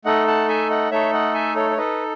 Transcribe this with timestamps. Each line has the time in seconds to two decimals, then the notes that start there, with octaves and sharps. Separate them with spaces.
0.05 A3 D#4 A4 D#5 F#5
0.27 F#5 A5
0.48 E5 G#5
0.70 D#5 F#5
0.91 A3 D#4 A4 C#5 E5
1.13 D#5 F#5
1.34 E5 G#5
1.56 A4 C#5
1.71 C#5
1.77 D#4 A4 B4 D#5